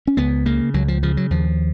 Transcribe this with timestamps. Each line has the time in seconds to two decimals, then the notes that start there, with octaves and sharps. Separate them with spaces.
0.07 C#4
0.17 C#2 B3
0.46 C#3 A#3
0.74 C#2 F#3
0.88 F3
1.03 C#3 F3
1.17 F#3
1.30 D#2 F3